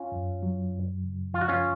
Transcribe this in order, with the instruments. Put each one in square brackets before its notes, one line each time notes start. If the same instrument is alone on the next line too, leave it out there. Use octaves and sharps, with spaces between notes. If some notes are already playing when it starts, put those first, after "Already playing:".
Already playing: [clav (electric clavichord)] C#4 F4
[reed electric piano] F#2
F#3
F#2
C#3
[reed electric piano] F3 [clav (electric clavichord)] F4
[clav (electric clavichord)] F#4
C#4 F4